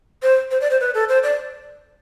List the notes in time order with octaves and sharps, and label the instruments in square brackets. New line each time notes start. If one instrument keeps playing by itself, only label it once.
[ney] C5
C5
D5
C5
B4
A4
C5
D5